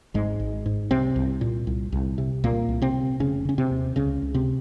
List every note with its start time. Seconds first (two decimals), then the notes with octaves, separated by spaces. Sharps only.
0.14 G#1 G#2 G#3
0.40 G#1
0.66 G#2
0.91 C2 C3 C4
1.16 C2
1.41 A#2
1.67 C2
1.92 C2
2.18 C3
2.44 C2 A#2 A#3
2.69 C2
2.82 C3 C4
2.94 C3
3.20 F1 C#3 C#4
3.45 C#3 C#4
3.58 C3 C4
3.71 D#2
3.96 C#2 C#3 C#4
4.22 C#2
4.34 C3 C4